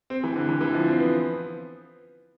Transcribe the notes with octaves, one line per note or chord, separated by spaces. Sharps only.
C4
E3
D3
E3
E3
F3
C4
B3